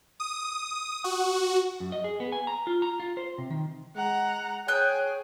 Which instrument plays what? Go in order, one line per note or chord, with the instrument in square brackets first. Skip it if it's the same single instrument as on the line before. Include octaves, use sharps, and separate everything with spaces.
[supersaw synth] D#6
F#4
[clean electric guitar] F#2
D#5
G#4
B3
G#5
A#5
F4
A#5
F4
C5
C3
D#3
[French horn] G#3 [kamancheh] F#5 A#5
[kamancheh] G#4 [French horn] C#5 [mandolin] G5 F#6